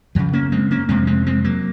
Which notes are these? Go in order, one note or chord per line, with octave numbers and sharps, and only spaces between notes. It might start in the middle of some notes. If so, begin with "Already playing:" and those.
F#2 C#3 F3
A#3 C#4
G#3 C4
A#3 C#4
F2 C3 G#3 C4
G#3 C4
G#3 C4
F#3 A#3